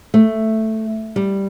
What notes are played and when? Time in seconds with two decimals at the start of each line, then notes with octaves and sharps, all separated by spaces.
0.14 A3
1.16 G3